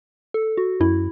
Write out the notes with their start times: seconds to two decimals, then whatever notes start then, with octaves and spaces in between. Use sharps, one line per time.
0.34 A4
0.57 F#4
0.80 F#2 E4